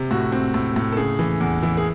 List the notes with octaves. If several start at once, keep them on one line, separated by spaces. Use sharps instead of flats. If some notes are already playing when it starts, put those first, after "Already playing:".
Already playing: C3
A2 F#4
C4
A2
A2
A4
C#3 G#4
E3
E2
E3
G#4